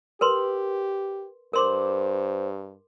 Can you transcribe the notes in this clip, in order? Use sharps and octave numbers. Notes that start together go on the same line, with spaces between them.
G4 A#4 B4 C6
G2 A#4 C5 C6 D6